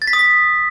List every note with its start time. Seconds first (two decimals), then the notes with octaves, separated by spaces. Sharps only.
0.02 A6
0.07 B6
0.13 D#6
0.19 B6